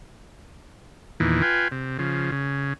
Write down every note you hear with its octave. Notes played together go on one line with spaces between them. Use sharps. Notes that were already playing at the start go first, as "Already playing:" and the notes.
E2 A#2 D#3 E3
F4 B4 G5 G#5
C3
C#3 F3
C#3